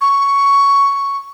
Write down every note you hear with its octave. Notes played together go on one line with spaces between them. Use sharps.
C#6